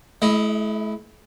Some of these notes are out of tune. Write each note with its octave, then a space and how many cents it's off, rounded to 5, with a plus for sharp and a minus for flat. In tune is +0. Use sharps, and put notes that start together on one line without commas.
A3 -45 E4 +0 D#5 +5